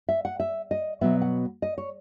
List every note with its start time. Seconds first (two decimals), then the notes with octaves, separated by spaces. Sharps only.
0.09 E5
0.25 F#5
0.40 E5
0.71 D#5
1.01 B2 F#3 B3 E5
1.22 F#5
1.62 D#5
1.78 C#5